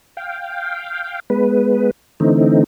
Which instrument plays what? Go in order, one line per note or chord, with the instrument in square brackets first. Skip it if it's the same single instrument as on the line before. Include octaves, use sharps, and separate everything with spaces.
[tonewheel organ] F5 G5
G#3 B3 B4
D3 E3 A3 C4 D#4